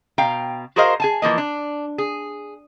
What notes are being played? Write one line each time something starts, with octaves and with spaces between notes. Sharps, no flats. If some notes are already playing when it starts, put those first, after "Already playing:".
B2 F5 G5 A#5
F#4 G#4 A#4 C5 D#5 F5
G#4 G#5 A5
E3 F3 A#3 D#5
D4
G#4